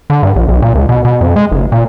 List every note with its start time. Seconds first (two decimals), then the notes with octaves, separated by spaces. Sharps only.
0.10 D3
0.23 G2
0.36 A#1
0.48 B1
0.62 A#2
0.75 C#2
0.89 B2
1.05 B2
1.21 F2
1.36 G#3
1.51 F#1
1.72 A#2